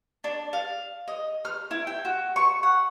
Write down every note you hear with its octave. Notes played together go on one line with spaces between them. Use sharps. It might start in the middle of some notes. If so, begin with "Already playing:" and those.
D4
F5
D#5
F6
E4
G5
F#4
C#6
F#5